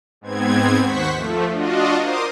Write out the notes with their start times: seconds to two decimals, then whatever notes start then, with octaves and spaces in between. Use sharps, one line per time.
0.21 G#2 B3 C4 G#6
0.84 D#2 C5 F#5 C#6 B6
1.16 F3 A3
1.52 D4 F4 F#4 D#5
1.98 A#4 C5 C6 D6 D#6